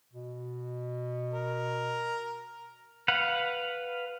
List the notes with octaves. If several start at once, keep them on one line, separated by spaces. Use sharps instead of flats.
B2
A#4
B4 F5 F#5